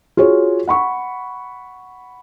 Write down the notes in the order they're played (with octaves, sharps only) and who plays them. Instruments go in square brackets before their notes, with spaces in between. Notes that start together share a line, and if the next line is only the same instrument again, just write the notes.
[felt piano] F4 F#4 G#4 C#5
F#5 B5 C#6